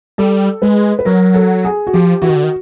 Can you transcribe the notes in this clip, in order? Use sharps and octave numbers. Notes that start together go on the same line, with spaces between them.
G3 A4
G#3 B4
B4
F#3 A#4
A4
G#4
F#4
F3 G4
E3 F#4
D#3
D3
D#3